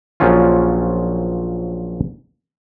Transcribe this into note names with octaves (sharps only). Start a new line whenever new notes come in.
A#1 F3 F#3 C#4 F4